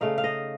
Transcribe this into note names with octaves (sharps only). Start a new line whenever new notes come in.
C#3 A3 D#4 F5
F5
D#5